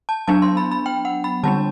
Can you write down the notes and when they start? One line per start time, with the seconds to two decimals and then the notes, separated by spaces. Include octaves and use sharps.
0.09 A5
0.28 F#3 B3 D4 A5
0.42 C6
0.57 B5
0.72 B5
0.86 G5
1.05 F#5
1.24 B5
1.43 D3 G3 D4 A5